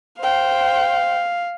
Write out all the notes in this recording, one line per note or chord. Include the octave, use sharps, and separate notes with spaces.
C5 F5 G5